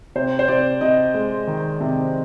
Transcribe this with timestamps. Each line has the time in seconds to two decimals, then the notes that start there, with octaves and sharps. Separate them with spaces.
0.15 C3 C5
0.39 C5
0.48 C3 D5
0.81 C3 D#5
1.14 G#3
1.47 D#3
1.80 C3